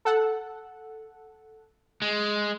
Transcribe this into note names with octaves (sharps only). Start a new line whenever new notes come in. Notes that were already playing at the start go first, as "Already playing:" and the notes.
A4 F#5
G#3